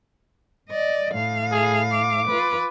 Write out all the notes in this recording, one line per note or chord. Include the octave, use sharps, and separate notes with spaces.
D5 D#5
A2 F5
G#4
D6
F4 B4